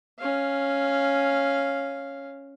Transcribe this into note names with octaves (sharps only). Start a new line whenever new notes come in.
C#4 F5